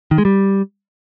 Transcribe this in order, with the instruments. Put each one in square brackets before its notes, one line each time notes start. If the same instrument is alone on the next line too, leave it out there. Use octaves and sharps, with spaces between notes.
[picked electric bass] D#3
G#3
G3